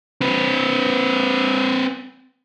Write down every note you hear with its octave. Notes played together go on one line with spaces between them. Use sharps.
C4 B4